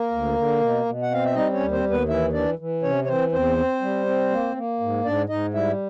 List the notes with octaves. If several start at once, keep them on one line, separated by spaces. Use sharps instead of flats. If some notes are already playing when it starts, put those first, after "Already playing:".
Already playing: A#3 A#4
D2
D3
B2
B2
F#5
C4 F5
E5
G3 D#4 D#5
C#4 C#5
D#2
C4 C5
D#2
B3 B4
E3 E4 E5
E3 D4 D5
E3
C3 C#4 C#5
C#5
E3 C4 C5
E2 C4 C5
C4
G3
C4
A#3
A#3
G#2
G#2 D4 D5
G#2 D#4 D#5
G3 E4 E5